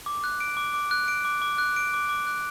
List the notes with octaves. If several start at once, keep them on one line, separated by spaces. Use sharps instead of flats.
D6
F#6
D7
D6
D6
F#6
D7
D6
D6
F#6
D7
D6
D6
F#6